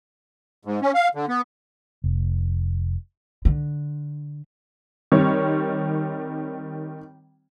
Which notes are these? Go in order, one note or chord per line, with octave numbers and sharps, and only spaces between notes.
G#2
C#4
F5
D3
B3
F1
D3
D#3 G3 C4 C#5